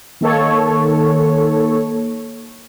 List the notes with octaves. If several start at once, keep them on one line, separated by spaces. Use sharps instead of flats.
D#3 A#3 A4 C#5